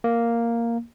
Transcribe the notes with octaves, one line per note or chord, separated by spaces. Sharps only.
A#3